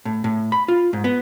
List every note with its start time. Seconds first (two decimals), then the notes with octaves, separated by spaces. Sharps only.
0.05 A2
0.24 A2
0.52 B5
0.68 F4
0.93 G#2
1.04 B3